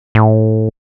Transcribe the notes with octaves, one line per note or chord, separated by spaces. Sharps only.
A2